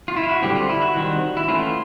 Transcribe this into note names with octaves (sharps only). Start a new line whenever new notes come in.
F4
E4
F4
F#4
D3 G3 C4 G4
F4
E4
F#4
D#3 G3 C4
E4
E3 A3 C#4 F4